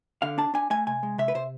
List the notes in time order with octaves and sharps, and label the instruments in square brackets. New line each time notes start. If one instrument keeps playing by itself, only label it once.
[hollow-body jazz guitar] D3 F5
D4 A5
D4 G#5
A3 G#5
C3 G#5
G#3
C3 E5
B4
C3 C5